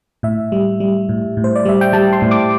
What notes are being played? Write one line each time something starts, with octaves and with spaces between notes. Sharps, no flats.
A2 E5
G3
G3
A2
A2
C5
D5
G3 E5
G5
G3 A5
C6
A2
D6